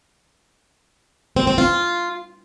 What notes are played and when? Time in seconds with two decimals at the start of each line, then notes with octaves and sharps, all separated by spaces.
1.36 C4
1.47 C4
1.58 F4